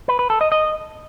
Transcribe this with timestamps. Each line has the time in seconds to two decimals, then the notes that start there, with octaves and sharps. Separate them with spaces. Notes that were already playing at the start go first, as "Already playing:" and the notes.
0.08 B4
0.19 B4
0.30 A4
0.41 D#5
0.52 D#5